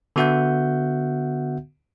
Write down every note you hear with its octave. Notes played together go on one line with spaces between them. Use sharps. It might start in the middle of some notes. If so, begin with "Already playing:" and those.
D3 B3 F#4 E5 F#5 G6